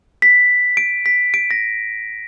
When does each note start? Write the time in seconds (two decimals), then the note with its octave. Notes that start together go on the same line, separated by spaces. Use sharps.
0.22 B6
0.77 D7
1.06 B6
1.34 D7
1.51 A#6